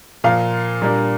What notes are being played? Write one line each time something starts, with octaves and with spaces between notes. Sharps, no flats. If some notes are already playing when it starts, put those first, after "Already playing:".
A#2 F3 A#3 F5
A#2 G3 A#3 D4